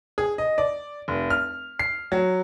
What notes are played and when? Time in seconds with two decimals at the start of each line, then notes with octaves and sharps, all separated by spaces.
0.18 G#4
0.38 D#5
0.58 D5
1.08 F1
1.30 F6
1.79 C7
2.12 F#3